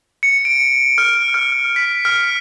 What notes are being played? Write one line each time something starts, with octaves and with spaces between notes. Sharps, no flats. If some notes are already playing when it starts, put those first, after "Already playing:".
C#7
D7
F6
F6
B6
F6